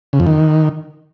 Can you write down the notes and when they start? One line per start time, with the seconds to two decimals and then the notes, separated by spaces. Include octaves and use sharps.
0.13 C#3
0.20 F2
0.27 D#3